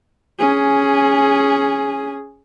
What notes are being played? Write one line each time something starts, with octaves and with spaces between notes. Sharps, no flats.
C#4 G#4